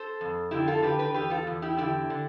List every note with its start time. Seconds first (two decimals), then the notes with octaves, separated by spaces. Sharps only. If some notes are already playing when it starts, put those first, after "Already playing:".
Already playing: A4 C5
0.21 F2
0.51 D3 E4 G4
0.67 F4 A4
0.82 D3 G4 B4
0.99 G4 B4
1.14 E2 G4 B4
1.30 F4 A4
1.47 E2
1.62 E4 G4
1.77 D3 E4 G4
2.10 D3